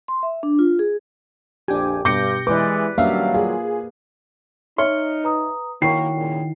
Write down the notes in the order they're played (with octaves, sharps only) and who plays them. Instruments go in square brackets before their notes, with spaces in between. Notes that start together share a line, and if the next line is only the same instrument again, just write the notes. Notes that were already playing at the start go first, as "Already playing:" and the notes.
[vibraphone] C6
E5
D4
F4
G#4
[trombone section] A#1 F2 [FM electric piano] D4 G5 G#5 [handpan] G4
[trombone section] G2 [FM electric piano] B2 G6 A#6 [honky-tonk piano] D6 C#7
[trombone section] E3 G#3 [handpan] B4 D5 [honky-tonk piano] D6
[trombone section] D#3 F#3 G3 [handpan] A#3 [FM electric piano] C#4 D4 E5 [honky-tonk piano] F5
[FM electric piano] F4 [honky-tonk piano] G#4
[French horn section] D#4 [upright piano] C#5 E5 [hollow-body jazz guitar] C6 [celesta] F6 C#7 G7
[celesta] B4 A#5 D#6
[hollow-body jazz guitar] D#3 E4 F#4 [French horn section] A#3 [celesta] C#5 G5 [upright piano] C#6 C7
[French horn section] A#2 C#3